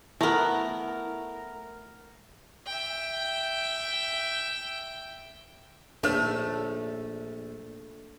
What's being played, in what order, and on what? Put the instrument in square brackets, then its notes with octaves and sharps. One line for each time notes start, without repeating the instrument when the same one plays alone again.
[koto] A3 B3 [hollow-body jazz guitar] E4 [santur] A#4 A#5
[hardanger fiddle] E5 G5
[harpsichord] A#1 G#4 F5 [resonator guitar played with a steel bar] A3 [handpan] D4 [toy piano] D#4 B4 C#5